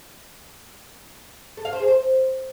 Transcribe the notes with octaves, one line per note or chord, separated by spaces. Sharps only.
A4
F5
C5
G#4
C5